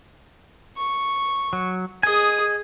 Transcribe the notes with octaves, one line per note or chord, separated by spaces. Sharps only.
C#6
F#3
G#4 D#5 G#5 D#6